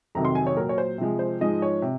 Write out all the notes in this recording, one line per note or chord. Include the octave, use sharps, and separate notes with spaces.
F2 C3 D#3 F#3 A#5
C6
G#5
C#5
A#2 F#3 A#4
C#5
C5
C3 F3 G#3
C5
G#2 F3 G#3 D#5
C#5
C3